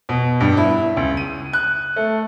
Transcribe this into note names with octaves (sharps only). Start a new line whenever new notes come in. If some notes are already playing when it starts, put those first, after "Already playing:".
B2
G2
E4
C#2
D#7
F#6
A3